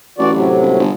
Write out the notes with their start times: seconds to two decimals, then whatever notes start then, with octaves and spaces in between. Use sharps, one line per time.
0.18 A1 E3 F#4 D5
0.32 A2 C3 F#3
0.61 D#1
0.79 G1